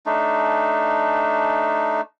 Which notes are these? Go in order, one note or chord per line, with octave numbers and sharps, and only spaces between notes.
A3 D4 D#4